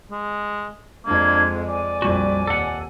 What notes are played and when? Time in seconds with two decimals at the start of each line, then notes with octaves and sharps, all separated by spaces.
0.11 G#3
1.06 F2 G#3 A#3 D4 G#6
1.68 D5 G#5
2.02 A#1 F2 G3 F#4
2.47 D#2 A4 F#5